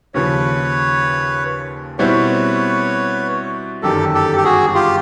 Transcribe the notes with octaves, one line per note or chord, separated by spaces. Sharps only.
D#2 C#3 F3 B4 C#5
B2 G3 C4 E4 B4 C#5
G1 F#2 D#3 G3 G4 A4
G4 A4
G4
F#4 G#4
F4 G4